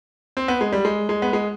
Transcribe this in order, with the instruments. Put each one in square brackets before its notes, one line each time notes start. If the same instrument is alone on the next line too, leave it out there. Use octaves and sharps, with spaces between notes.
[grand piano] C4
B3
G#3
G3
G#3
G#3
B3
G#3